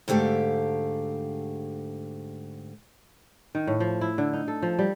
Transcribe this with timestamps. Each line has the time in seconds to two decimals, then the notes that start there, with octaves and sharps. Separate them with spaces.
0.08 G#2 D3 A3 G4 F5
3.55 D#3
3.67 A2
3.80 F3
4.01 E4
4.18 D3
4.33 D#4
4.48 A4
4.62 F3
4.79 G3